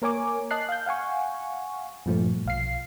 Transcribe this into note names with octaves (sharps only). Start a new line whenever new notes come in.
A#3 A#4 C#5 G#5 D6
D#5 A5 F#6 C7
F5 G6
F5 F#5 G#5 C#6
G2 A#2 F3 A3
B1 F5 C7